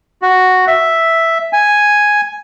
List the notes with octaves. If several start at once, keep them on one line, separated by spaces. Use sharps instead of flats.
F#4
E5
G#5